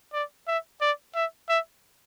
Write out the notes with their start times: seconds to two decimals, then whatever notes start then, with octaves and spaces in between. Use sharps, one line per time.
0.13 D5
0.47 E5
0.81 D5
1.15 E5
1.49 E5